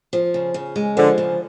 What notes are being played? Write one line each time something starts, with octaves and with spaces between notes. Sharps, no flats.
F3
C#3
C#3
G#3
D3 F3
C#3